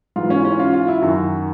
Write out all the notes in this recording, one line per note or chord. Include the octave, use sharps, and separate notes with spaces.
G#2 E3 F4
C#4
C#4
F4
F4
E4
F#2 D#3 F#4